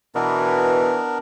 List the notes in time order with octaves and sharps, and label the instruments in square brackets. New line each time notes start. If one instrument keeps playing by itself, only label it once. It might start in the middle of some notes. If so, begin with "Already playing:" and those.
[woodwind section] B2 E3 [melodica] B3 D4 A#4